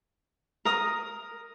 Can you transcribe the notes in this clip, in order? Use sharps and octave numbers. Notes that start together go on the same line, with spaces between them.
A#4 D#6